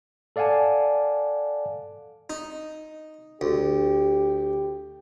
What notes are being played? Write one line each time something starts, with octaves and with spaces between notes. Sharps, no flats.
A4 D5 F5 F#5 G#5 A5
D#4
D2 G4